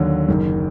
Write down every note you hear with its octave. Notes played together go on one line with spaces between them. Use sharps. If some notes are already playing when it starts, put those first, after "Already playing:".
Already playing: D#2 D3 F#3
F#1 F#2 D#3